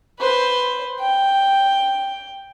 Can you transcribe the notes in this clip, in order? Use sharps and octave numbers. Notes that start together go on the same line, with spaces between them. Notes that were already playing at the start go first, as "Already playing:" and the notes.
B4 C5
G5